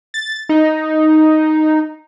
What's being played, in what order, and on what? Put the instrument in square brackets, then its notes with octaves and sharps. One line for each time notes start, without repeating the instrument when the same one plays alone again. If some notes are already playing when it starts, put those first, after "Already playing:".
[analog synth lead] A6
D#4